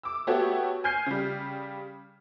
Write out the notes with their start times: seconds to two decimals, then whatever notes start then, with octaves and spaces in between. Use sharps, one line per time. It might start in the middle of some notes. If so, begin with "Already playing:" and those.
0.03 D6 E6
0.27 A3 B3 F#4 G4 A4 C#5
0.84 G#5 F6 G6 C7
1.06 C#3 G3